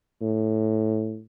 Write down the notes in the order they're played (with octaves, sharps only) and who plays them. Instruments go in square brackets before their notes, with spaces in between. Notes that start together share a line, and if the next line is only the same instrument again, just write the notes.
[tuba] A2